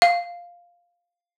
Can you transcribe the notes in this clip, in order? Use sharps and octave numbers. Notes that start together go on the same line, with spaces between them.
F5